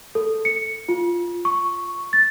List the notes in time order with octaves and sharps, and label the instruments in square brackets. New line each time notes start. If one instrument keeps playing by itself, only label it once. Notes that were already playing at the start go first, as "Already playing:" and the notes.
[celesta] A4
C#7
F4
C#6
A6